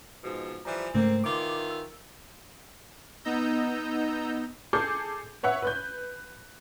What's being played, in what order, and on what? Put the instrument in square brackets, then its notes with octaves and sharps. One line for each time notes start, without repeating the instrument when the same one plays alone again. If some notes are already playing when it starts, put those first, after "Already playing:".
[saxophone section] G#2 B2 F3
[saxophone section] E3 F3 G3 [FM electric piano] A#5
[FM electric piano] G#2 C#3 A3 [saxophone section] A#3 C4
[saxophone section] D#3 E3 F4 [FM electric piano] C6 D6
[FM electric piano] E6
[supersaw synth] B3 D#4 D#5 A#5 E6 G6
[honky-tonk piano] G#4 A4 D6 G6
B4 C#5 E5 F#5
B4 F#6 G6